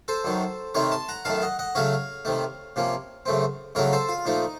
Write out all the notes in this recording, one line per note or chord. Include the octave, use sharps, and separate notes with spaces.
A4 C5
F#2 D#3 F#3
C3 D#3 A3 C4 A#4 C#5
A5 C6
F#5 A#5
F#2 D#3 A3 F5 A5
D#5 F#5
D#5 F#5
C#3 F#3 A3 C#4 C#5 F5
C3 D#3 A3
C3 F3 A#3 C#4
F#2 C#3 A3 C4
F2 C#3 F#3 A3 A#4 C#5
A4 C5
F4
A#2 F3 A3 D#4